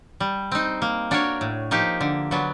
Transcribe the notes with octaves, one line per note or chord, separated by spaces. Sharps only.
G3
C4 D#4
A#3
D4 F#4 A#4 C#5
A2
F3 A#3 D#4 G4
D3
F#3 B3 D4 F#4